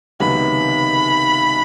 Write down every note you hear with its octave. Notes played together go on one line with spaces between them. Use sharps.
C#2 C3 D#3 F#3 B3 B5